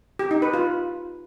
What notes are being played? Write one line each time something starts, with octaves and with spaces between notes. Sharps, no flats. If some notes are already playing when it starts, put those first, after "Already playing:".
G4
D#4
B4
F4